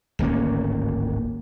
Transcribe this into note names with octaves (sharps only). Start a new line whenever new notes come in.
D1 G#1 A#3 C#4